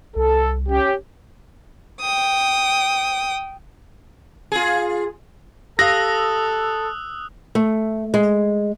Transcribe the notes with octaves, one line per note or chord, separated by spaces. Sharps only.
C2 A4
C#4 G4
G5 D#6
F4 G#4
G4 A4 F5 D#6 E6 F#6 A#6
A3
G#3